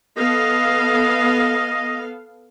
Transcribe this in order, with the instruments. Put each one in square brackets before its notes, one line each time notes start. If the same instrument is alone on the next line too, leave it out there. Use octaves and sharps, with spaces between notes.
[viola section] B3 A4 F5 [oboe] D#5